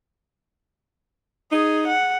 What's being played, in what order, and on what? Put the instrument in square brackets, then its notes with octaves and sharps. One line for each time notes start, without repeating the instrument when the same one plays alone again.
[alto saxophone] D#4 [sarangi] G#4
[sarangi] F#5